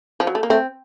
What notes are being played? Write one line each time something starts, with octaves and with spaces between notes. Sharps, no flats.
F3
F#3
A3
A#3
A3 C4